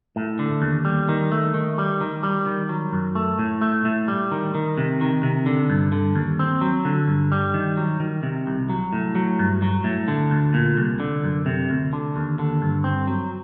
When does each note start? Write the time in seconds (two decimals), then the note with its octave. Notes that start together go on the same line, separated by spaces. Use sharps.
0.16 A2
0.39 D3
0.62 D#2
0.85 G3
1.09 D#3
1.32 A3
1.54 D#3
1.78 G3
2.01 D#3
2.23 G3
2.46 D#3
2.69 F#3
2.92 F#2
3.15 A3
3.39 A2
3.61 A3
3.85 A2
4.08 G3
4.32 D#3
4.55 D#3
4.78 C3
5.01 D#3
5.23 C3
5.46 D3
5.70 G2
5.92 D3
6.16 D#2
6.39 C4
6.61 F#3
6.85 D3
7.07 G2
7.32 G3
7.54 D#3
7.77 F#3
8.00 D#3
8.23 C3
8.47 C2
8.69 F#3
8.93 A2
9.15 F#3
9.39 G2
9.62 F#3
9.84 A2
10.08 D3
10.31 D2
10.54 A#2
10.77 C2
11.00 D3
11.23 F#2
11.46 C3
11.70 D2
11.93 D3
12.16 D#2
12.39 D3
12.62 G2
12.84 C4
13.07 F#3